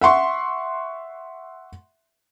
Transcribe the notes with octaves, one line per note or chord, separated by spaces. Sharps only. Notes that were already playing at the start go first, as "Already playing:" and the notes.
E5 F#5 C6 C#6